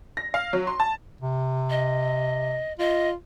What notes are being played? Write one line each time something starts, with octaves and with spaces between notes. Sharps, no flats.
A#6
F5
F#3
C6
A5
C3
D#5
F4 D#5